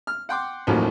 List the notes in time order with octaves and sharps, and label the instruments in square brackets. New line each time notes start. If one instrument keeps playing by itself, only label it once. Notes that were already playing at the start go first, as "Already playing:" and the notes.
[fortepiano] F6
F#5 G5 C6 D6
A1 D#2 A2 D#3 F3 F#3